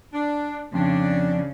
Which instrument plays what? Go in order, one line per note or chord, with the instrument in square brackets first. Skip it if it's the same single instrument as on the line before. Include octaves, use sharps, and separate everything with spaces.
[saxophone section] D4
[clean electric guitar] F2 [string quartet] C#3 [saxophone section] D4